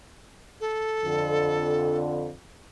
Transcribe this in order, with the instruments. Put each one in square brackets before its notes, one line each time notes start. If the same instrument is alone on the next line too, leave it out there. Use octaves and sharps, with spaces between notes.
[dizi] A4
[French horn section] F2 D3